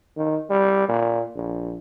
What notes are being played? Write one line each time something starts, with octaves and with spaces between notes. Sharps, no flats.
D#3
G3
A#2
A#1